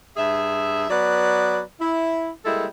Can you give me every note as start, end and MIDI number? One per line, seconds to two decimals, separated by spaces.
0.17 0.86 43
0.17 0.86 68
0.17 0.86 76
0.89 1.61 54
0.89 1.61 59
0.89 1.61 71
0.89 1.61 74
1.80 2.29 64
2.45 2.65 55
2.45 2.65 56
2.45 2.65 58
2.45 2.65 64
2.45 2.65 69